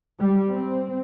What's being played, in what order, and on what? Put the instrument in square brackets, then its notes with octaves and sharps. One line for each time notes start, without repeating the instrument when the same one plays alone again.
[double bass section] G3
C4